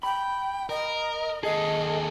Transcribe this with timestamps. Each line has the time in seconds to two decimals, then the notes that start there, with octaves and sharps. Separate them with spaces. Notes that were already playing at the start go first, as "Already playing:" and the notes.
0.03 G5 B5
0.70 A#4 D#5
1.43 D#2 G#4 A4 D#5